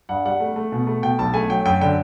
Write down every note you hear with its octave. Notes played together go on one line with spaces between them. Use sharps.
G2 F#5
G3 F#5
A3
A3
B2
A3
B2 G5
B1 A5
A3 G#5
F#3 G5
F#2 G5
D3 G5